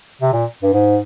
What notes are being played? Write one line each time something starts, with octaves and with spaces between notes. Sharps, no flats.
C3
A#2
G2
G#2